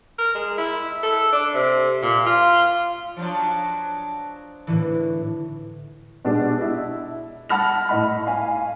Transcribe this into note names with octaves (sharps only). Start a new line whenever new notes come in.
A#4
G#3
E4
A4
D4
C3
A#2
F4
F3 F#3 D4
A2 D3 E3
B2 G#3 D4 G4
E4
F#5 A5 B5 F6 A#6 F7
A2 D#5 B5
F5 G#5